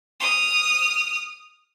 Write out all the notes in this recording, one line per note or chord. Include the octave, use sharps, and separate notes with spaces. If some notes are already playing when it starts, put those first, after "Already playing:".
D#6 F6